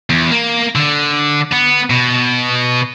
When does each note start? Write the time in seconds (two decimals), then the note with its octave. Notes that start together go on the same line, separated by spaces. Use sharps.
0.10 E2
0.31 A#3
0.75 D3
1.53 B3
1.90 B2